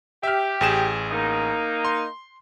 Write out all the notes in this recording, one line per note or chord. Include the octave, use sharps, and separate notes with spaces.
G4 E5 F6
A1 G#4 E7
A#3 D#4
C6